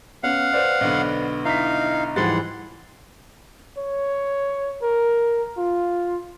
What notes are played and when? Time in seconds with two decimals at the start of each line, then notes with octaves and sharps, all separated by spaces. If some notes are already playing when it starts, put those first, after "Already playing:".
0.23 B3 C#4 F5 F#5
0.53 B4 C5 D5
0.81 B1 D3 B3
1.45 D#4 E4 F5 B6
2.16 G#2 E3 F3 G3 F#5 B5 C6 A6
3.78 C#5
4.82 A#4
5.58 F4